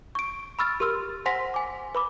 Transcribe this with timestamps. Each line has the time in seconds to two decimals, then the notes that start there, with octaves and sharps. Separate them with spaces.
0.15 C#6 D7
0.59 B5 C#6 E6 F6 A6
0.80 G4 A#4 C6 E6 F6
1.26 C5 F#5 G#5 C6 A#6 B6
1.54 G#5 D6
1.95 B4 B5 D6